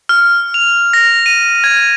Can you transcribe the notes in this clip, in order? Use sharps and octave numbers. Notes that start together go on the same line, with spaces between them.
F6
F7
A#6
D#7
G#6